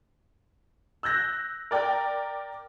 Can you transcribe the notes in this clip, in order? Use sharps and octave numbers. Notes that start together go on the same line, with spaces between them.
E6 F#6 G6 A#6
A#4 D5 G5